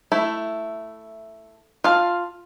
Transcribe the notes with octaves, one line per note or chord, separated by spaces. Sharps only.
A3 E4
F4 F5 A5